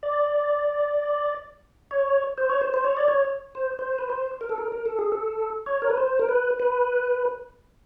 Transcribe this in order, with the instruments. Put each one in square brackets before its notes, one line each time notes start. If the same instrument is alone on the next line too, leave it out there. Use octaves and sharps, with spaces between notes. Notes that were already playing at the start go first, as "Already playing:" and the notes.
[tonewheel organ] D5
C#5
C5
C#5
C5
C5
C#5
D5
C#5
C5
C5
B4
C5
A#4
A4
A#4
A#4
A4
G#4
A4
C#5
A#4
B4
C5
A#4
B4
B4